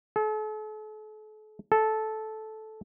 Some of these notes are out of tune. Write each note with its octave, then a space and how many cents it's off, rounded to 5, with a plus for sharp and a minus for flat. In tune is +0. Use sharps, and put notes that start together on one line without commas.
A4 -40
A4 -10